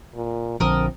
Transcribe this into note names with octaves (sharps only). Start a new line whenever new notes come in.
A#2
A#1 D3 F3 C4 A4 A#4 D#6